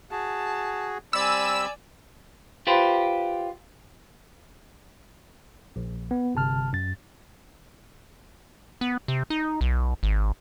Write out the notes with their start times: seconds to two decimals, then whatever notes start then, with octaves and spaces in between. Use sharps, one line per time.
0.11 F#4 G#4 A5
1.13 G3 C4 D5 G#5 B5 E6
2.67 F4 G4 B4 C5
5.76 A#1
6.11 B3
6.35 G1 C3 A5 F6
6.73 F#2 A6
8.81 B3
9.08 C3
9.30 D#4
9.61 B1
10.03 G#1